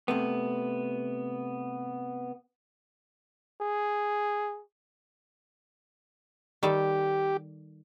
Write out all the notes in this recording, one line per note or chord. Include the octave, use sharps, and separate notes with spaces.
C3 A3 B3
G#4
D#3 G3 G4 A4